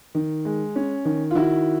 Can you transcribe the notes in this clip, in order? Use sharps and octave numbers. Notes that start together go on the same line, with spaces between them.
D#3
G#3
C#4
D#3
F4
D#3 E4 F#4